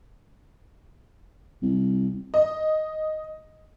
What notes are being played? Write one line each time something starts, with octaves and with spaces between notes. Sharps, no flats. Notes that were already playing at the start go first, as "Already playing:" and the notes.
C2
D#5